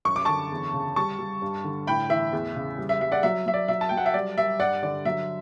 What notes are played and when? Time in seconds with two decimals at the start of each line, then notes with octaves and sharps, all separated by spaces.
0.05 F#2 C#6
0.16 D6
0.25 D3 A5 C#6
0.51 E2
0.73 C#3
0.96 G3 A5 C#6
1.19 G3
1.42 G2
1.64 D3
1.87 A2 G5 B5
2.09 E3 E5
2.33 E2
2.56 C#3
2.78 G3
2.89 E5
3.01 G3 E5
3.12 D5 F#5
3.23 F#3 E5
3.46 F#3 E5
3.54 D5
3.68 F#3 E5
3.81 A5
3.89 F#3 G5
3.97 F#5
4.06 E5
4.14 G3 D5
4.37 G3 E5
4.60 G2 D5 F#5
4.83 D3 D5
5.05 F#3 E5